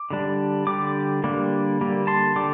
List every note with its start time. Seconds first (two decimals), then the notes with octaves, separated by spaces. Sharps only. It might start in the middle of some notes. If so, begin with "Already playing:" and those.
Already playing: D6
0.10 D3 G3 D4
0.67 D3 G3 D6
1.24 D3 G3 A#3 D4
1.81 D3 G3 A#3
2.07 A5 C6
2.36 D3 G3 D6